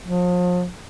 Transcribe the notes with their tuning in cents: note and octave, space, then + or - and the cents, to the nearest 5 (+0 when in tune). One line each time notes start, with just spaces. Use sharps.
F3 +40